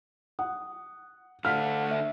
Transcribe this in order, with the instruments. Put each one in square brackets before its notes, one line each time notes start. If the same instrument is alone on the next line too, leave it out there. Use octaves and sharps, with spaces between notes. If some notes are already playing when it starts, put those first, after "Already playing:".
[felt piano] F#5 [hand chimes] D#6
[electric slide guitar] D3 A3 D4 [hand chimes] F5 [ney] F#5 [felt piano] F6 B6
[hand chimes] E5